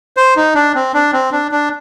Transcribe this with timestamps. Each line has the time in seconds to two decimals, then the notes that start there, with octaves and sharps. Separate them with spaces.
0.17 C5
0.36 D#4
0.55 D4
0.75 C4
0.94 D4
1.13 C4
1.32 D4
1.51 D4